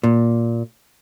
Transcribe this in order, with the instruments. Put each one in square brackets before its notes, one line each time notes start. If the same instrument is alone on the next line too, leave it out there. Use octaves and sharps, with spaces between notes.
[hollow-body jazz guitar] A#2